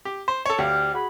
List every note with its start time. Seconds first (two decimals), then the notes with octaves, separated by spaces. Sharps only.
0.05 G4
0.28 C5
0.46 A4 C#5
0.58 D2 G4 D5 F5
0.93 F#4 G#4 B5